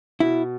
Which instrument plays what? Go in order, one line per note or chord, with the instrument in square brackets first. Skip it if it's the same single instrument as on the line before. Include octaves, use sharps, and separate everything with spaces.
[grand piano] B2 [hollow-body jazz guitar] E4